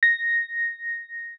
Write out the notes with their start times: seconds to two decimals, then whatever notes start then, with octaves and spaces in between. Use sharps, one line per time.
0.03 A#6